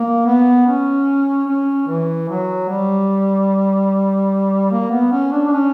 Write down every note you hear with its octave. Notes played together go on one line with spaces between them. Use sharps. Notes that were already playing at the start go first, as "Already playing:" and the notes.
Already playing: A#3
B3
C#4
C#4
E3
F#3
G3
A#3
B3
C#4
D4
D4
C#4